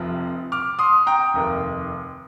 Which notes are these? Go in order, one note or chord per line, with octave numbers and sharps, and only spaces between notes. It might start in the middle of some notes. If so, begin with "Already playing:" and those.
Already playing: F1 F2 C3 F3
D6 F6
C6 D#6
G5 A#5
F1 D#2 D#3